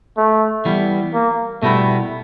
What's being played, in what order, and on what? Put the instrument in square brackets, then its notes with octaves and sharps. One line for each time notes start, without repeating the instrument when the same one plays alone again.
[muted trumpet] A3
[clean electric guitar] E3 G3 B3
[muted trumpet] A#3
[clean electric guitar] B2 G3 B3 E4 [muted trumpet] A3